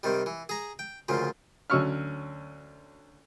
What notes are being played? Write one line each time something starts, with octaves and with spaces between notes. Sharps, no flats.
C3 D#3 G3
E3
G#4 A#5
G5
D2 A#2 C#3 F3
D2 F#3 C#4 C#6 E6 F6